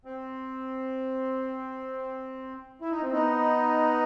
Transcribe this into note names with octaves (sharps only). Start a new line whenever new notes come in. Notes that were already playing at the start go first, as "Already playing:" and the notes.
C4
E4
D#4
C4
B3 D#4